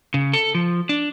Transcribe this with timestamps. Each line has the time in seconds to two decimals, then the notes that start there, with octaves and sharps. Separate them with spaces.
0.14 C#3
0.33 A4
0.55 F3
0.89 D4